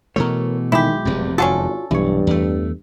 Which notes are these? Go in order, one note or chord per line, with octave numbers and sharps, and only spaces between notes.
B2 E3 A3 A#4 C#5
B1 D#3 G#3 E4 G4 B5
F1 E2 C3
G#1 C#4 D4 F4 F#4 A4 F#5
B1 G2 E3 C#5
E2 A3